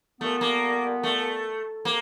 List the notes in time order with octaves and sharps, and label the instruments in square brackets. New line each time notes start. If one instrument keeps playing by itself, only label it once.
[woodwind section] A#2 G3 B3 [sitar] A3
[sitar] A#3
A3
[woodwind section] C3 [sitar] A#3